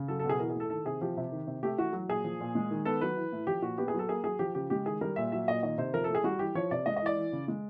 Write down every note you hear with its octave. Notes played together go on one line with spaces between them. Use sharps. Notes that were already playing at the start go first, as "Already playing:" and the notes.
Already playing: C#3
F#3 A4
A4
B2
G#4
E3 A#4
G#4
A2 A4
D#3 A4
C3 G#4
F3 G4
C3
D#3
C3
A3 G4
E3 F#4
F#3
A#2 G#4
F3
A#2
G#3
D#3
B3 A4
F#3 B4
E3
A2
F3 G4
A#2 F#4
B3 G4
G#4
F#3
A4
A#3 G#4
F#3 G#4
F3 G4
C#3 G4
G#3 G4
D#3 G#4
G3 A#4
A#2 E5
F#3 E5
A#2 D#5
D#3 D#5
C3 C5
F3 A#4
A4
A2
G#4
G3 F#4
E3 G4
F3 C#5
C3 D5
G#3 D#5
D#5
E3 D5
E3
C#3
G#3